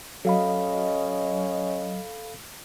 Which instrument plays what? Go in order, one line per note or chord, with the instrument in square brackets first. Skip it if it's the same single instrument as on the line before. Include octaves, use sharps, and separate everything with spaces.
[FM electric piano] F#3 [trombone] C#4 [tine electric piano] A4 F5 B5 [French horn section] D#5